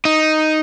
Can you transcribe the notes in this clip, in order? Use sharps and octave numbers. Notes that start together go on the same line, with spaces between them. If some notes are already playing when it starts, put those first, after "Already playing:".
D#4